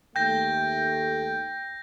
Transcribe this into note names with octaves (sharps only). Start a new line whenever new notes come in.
D#2 A3 G5 G6 A#6